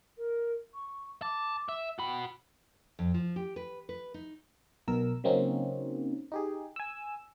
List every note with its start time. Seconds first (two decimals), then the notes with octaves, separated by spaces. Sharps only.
0.17 A#4
0.74 C#6
1.22 A5 D6
1.69 E5
1.99 F#4 G5 B5
2.99 F2
3.14 F3
3.36 G4
3.56 B4
3.89 B4
4.14 D#4
4.88 B1 B2 A#4 E6
5.24 C#3 F#3 A#3 C4 C#4 D#4
6.32 D#4 G4 G#4
6.76 G#5 E6